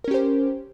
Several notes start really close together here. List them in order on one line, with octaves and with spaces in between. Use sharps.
A#4 C#4 G4 C5